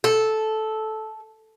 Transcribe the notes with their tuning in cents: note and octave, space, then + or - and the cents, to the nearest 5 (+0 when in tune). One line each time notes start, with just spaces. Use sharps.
A4 -10